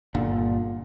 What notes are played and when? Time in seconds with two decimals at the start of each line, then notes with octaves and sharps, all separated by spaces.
0.15 G1 A#2 D3